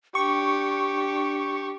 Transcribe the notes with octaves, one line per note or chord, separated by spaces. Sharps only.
D4 G4 C#6